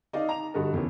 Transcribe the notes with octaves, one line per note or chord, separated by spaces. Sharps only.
D#4 D5 D#5 F5
A#5 F7
G2 D3 F#4 A4 D#5
E2 D3 D#3 C#4